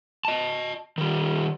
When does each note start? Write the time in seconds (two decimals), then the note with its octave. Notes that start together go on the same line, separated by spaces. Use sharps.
0.25 D#5 A5
0.98 D#3 G3